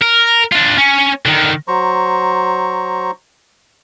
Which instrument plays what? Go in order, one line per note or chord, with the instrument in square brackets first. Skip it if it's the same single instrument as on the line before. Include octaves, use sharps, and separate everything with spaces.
[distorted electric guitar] A#4
D4 F4
C#4
D3 D#3
[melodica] F#3 C5 A#5 C#6